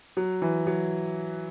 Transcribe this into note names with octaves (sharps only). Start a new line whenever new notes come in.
F#3
E3
F#3